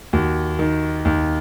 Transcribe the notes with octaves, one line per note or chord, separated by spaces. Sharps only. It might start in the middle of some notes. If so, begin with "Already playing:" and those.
D#2 F#4
D#3
D#2